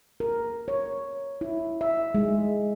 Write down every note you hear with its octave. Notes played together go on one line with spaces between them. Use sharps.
A#4
C#5
E4
E5
G#3